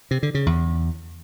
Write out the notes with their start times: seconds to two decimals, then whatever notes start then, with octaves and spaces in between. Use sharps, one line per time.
0.11 C3
0.23 D3
0.35 C#3
0.46 E2